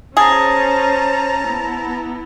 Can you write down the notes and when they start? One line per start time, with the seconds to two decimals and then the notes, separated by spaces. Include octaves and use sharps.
0.17 C#4 G#4 C5 A5 A#5
1.45 B3 E4